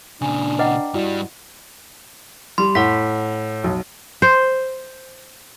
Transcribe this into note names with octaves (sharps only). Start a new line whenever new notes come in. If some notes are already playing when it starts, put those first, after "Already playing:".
A#2 C#3 D4 G#5
B4 D#5 F#5 G5 A#5 D6
G2 G3 E4 F#4 D5
G3 C6
A2 F#5 B6
B1
C5